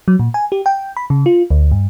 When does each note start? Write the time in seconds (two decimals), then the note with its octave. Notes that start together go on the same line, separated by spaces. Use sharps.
0.08 F#3
0.19 A#2
0.34 G#5
0.52 G4
0.66 G5
0.97 B5
1.10 C#3
1.26 F4
1.50 D2
1.72 G2